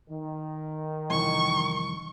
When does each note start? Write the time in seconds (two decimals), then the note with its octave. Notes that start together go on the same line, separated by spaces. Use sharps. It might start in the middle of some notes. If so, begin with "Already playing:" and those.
0.10 D#3
1.10 C2 F2 E3 C#6